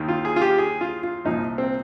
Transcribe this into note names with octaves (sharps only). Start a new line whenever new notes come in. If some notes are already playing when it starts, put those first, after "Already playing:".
Already playing: D#2 D#3
F4
G#4
F4
G4
G#4
F4
F4
C2 A#2 F3 D#4
C4